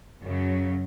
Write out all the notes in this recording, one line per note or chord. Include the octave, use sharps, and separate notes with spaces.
F#2 C#3 F#3